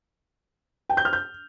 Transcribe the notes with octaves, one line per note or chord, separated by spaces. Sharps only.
G5
G6
F6
G6